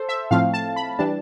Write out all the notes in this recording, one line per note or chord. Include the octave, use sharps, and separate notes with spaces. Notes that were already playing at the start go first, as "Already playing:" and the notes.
Already playing: A4 C5
E5
A2 F3 A3 C4 F5
A5
B5
E3 G3 D4 A5